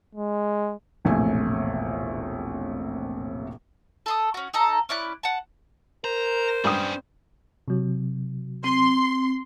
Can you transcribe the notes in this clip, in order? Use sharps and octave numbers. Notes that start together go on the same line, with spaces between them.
G#3
E1 A#1 A2 C3 A3 G#5
A4 C6 D#6
C#4 F#4
D#4 A4 A#5
C#4 E4 D5 F#6
F#5 A5
A#4 C5 A#5
G2 C#4 D4 D#6
C3 F#3
C4 C6